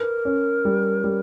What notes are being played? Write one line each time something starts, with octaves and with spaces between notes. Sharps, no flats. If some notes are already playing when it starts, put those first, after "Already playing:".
Already playing: A#4 B4
C#4
G3
G3